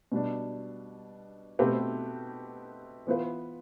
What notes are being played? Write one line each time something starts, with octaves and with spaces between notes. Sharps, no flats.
B2 G3 D4
B2 A3 C4 G4 B4
E3 B3 F4 B4